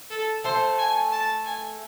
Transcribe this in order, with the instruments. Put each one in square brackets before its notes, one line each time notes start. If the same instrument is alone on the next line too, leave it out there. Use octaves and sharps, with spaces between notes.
[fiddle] A4
[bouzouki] A3 A4 [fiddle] C5
[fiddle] G#5
A5
G#5